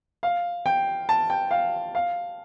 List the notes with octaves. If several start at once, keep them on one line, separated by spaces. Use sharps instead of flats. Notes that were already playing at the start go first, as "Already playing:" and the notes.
F5
G5
A5
G5
F5
F5